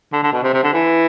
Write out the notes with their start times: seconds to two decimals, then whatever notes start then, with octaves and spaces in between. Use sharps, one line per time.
0.13 D3
0.23 D3
0.32 B2
0.43 C3
0.53 C3
0.63 D3
0.73 E3